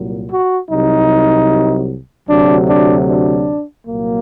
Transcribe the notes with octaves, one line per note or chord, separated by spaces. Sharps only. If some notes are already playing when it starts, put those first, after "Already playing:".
Already playing: C2 A#2 F#3
F#4
C2 C3 F#3 D#4
D2 C3 F#3 D4
D4
D4
C2 A#2 F#3 A#3